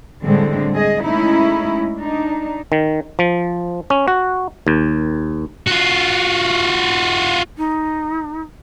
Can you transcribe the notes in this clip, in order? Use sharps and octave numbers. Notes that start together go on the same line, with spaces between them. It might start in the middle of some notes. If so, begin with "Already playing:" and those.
A2 D3 G3 G#3 C4
G#4 D#5
G#3 A3 C#4 D#4 E4
D4 D#4
D#3
F3
C#4
F#4
D#2
F4 F#4
D#4